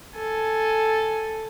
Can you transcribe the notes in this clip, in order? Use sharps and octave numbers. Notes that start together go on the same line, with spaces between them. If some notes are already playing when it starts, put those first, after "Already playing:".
A4 G#5